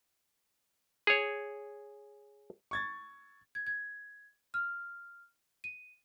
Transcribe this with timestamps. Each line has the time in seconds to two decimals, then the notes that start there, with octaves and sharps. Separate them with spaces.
1.07 G#4 C#5
2.71 C#6 G#6 A6
3.55 G#6
3.67 G#6
4.54 F6
5.64 D#7